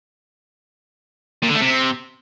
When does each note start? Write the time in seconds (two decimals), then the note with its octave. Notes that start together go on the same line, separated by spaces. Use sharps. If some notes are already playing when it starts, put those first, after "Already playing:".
1.43 A#2
1.49 D3
1.55 A3
1.61 C3